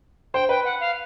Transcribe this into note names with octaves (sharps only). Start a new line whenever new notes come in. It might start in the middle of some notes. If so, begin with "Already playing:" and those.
C5 G5
B4 G5
F#5
F5